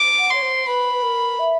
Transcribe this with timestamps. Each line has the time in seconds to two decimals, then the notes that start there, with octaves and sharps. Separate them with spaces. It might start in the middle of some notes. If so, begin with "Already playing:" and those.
Already playing: D6
0.18 F#5
0.30 C#5 C6
0.42 C5
0.66 B4 B5
0.93 B4
1.02 A#4
1.39 E5